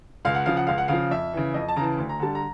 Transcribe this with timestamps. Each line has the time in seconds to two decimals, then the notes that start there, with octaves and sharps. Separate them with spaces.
0.25 C#2 F5
0.35 F#5
0.46 C#3 F3 F5
0.57 F#5
0.67 C#2 F5
0.78 F#5
0.88 C#3 F3 F5
1.11 F2 E5
1.33 C#3 E3
1.54 F2 D#5
1.69 A5
1.76 C#3 A#5
1.80 E3 A5
1.98 D2
2.09 A#5
2.20 D3 G3 A5
2.35 A#5